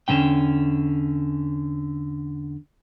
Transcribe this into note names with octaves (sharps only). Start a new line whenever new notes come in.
E2 D3 E3 C#4 G5